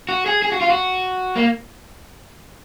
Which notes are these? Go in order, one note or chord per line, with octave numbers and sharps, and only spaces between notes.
F#4
G#4
G#4
F#4
F4
F#4
A#3